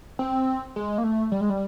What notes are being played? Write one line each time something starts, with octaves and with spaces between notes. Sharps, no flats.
C4
G#3
A#3
A3
G3
G#3
G3